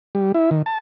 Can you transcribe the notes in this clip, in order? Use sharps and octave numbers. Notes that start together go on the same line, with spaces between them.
G3
E4
D#3
A5